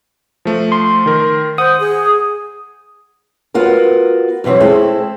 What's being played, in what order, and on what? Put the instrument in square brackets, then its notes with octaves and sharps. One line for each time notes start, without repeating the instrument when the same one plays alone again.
[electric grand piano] F3 A3
[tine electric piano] C6
[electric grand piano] D#3 A#4
[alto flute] C5 [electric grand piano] F#5 [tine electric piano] D#6
[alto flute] G#4
[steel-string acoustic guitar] B3 F4 F#4 A#4
F#2 B2 E3 C4 C#5
G#3 C4 E4 A4